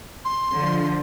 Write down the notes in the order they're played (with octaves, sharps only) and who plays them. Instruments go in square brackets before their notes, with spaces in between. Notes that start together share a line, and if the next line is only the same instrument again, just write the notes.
[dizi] C6
[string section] D3 F3